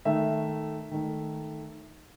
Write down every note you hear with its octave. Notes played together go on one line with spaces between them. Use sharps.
D#3 A3 E5
D#3 A3